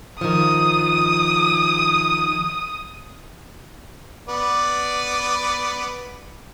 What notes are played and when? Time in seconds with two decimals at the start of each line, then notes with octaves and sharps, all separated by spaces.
0.21 D#3 F3 D#6
4.28 B3 D5